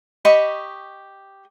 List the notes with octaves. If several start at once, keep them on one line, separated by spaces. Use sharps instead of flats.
G4 D#5 B5 C#6